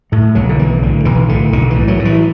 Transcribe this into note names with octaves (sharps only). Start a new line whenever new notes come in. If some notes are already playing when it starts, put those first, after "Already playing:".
A2 A3
B1 F#3
D3
B1 E3
A2 D3
B1 E3
A2 D3
B1 D3
A2 E3
F#3
A2
E3